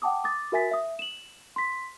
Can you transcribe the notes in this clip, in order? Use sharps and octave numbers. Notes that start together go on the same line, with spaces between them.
F#5 G5 A5 D6 D#6
D6 D#6 A6
F#4 A#4 E5 G#5 A6 B6
E5 D#6
E7 F#7
C6 B6